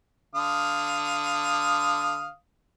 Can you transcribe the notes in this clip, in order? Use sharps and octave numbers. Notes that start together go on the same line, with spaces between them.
D3 F5 D#6